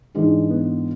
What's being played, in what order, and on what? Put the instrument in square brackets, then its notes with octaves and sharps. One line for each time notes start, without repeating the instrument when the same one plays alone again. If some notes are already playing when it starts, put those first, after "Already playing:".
[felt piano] G#2 E3 G#3 D4 G#4
[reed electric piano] B3